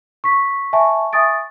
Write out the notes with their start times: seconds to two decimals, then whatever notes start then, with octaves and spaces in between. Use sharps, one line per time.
0.24 C#6 B6
0.73 E5 G#5 A5 C#6
1.13 E5 G#5 C#6 D#6 A6 D7